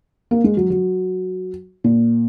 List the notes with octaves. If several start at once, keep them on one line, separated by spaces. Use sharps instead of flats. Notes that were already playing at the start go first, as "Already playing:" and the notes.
A#3
G#3
F#3
F#3
A#2